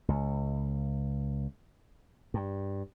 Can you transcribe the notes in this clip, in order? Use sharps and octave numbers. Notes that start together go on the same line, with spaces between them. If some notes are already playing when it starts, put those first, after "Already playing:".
C#2
G2